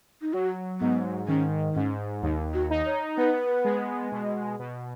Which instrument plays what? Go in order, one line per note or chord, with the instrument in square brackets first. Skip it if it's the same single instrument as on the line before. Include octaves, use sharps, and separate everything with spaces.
[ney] D#4
[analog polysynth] F#3 [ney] F#4
[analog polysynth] G#2 [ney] B3
[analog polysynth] D#3 [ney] C#4
[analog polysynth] G#2 [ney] C#4
[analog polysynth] D#2 [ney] D#4
[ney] F#4
[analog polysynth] D#4
[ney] C#5
[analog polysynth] B3 [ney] B4
[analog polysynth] G#3
B2
B2